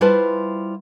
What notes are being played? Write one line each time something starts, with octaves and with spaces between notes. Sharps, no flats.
G3 E4 F4 B4 C5 A5